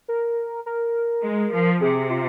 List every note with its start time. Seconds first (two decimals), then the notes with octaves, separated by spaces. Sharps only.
0.08 A#4
0.66 A#4
1.23 G#3
1.52 F3
1.81 C3 G#4
2.10 F4